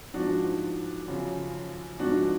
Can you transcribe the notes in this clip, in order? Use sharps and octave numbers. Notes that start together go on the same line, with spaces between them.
G#2 F3 D4 F#4
F#2 C#3 F3
G#2 F3 D4 F#4